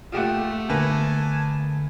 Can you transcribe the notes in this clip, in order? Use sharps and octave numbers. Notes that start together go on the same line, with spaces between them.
A3 F4 G4 F#5
D3 A#3 B3 B4 G#5 A5